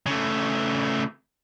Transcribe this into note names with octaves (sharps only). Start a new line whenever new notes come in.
C#3 A3